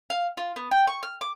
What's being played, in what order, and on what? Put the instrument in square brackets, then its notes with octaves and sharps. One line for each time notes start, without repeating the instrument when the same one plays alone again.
[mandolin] F5
F4
B3
G5
C#6
F6
D6